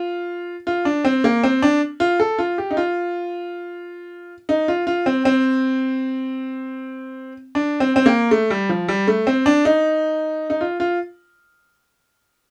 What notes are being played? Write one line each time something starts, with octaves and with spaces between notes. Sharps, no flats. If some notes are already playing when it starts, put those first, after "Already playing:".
Already playing: F4
F4
D4
C4
A#3
C4
D4
F4
A4
F4
G4
D#4
F4
D#4
F4
F4
C4
C4
D4
C4
C4
A#3
A3
G3
F3
G3
A3
C4
D4
D#4
D#4
F4
F4